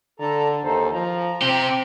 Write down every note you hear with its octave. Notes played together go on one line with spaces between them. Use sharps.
D3 A4 A5 A#5
D#2 D#4 A4 C5
F3 A#5
C3 C4 G4